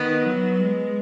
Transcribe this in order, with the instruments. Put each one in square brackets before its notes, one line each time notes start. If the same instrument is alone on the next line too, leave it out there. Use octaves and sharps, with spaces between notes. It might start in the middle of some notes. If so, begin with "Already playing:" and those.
Already playing: [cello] D#3 [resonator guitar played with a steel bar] B3
[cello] F#3
G#3